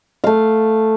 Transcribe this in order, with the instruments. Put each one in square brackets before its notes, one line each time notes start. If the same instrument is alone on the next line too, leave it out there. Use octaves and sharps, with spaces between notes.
[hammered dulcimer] A3 F5